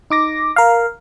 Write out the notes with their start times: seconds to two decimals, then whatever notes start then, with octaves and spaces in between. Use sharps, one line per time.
0.10 D#4 D6 A#6
0.56 A#4 F5